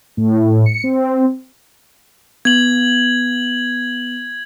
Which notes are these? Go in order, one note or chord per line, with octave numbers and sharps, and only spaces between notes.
A2
C#7
C4
B3 G#6 F#7